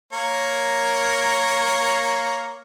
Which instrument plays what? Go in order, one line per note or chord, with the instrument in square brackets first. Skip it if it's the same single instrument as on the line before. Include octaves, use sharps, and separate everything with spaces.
[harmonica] A#3 A#4 C#5